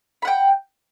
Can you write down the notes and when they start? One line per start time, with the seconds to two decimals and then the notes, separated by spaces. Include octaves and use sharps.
0.22 B5
0.25 F#5
0.27 G5